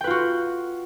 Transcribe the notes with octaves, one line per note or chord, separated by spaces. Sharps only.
F4 F#4 B4 G5